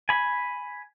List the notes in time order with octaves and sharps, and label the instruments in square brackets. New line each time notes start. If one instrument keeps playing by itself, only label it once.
[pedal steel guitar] G#5 B5